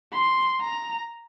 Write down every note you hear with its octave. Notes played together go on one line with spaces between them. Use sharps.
C6
A#5